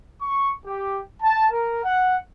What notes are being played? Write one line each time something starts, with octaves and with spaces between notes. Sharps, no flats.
C#6
G4
A5
A#4
F#5